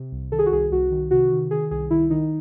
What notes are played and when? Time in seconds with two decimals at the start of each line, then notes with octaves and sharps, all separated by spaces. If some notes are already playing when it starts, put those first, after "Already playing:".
Already playing: C3
0.12 C2
0.32 D#3 A4
0.39 G#4
0.46 F#4
0.52 C2 G#4
0.71 C2 F#4
0.91 D#3
1.11 C3 F#4
1.32 D#3
1.51 D#3 G#4
1.71 C2 G#4
1.90 D#3 E4
2.10 D#3 D#4